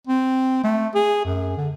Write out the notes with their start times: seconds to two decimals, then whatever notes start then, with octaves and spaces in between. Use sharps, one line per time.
0.07 C4
0.64 A3
0.95 G#4
1.25 F#2
1.57 D3